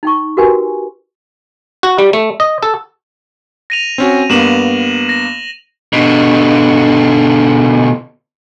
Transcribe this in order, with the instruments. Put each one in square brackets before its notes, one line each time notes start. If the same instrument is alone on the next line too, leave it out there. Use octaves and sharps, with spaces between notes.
[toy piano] D#4 G5 C#6
F#4 G4 A#4 B4 G5 G#5
[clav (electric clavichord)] F#4
G3
A3
D#5
A4
[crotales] A#6 D#7 F7
[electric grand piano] C4 C#4 F#4
[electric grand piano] G2 A#3 B3 [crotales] E7 F#7
[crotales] A#6
[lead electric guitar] B2 D3